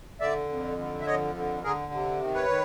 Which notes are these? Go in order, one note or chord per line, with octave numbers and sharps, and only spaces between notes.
D3 D5 E5
F2
D3
E5
F2 C#5 D#5
D3
D3 G#4 A#4
C3
D#3
B4 C#5
D#3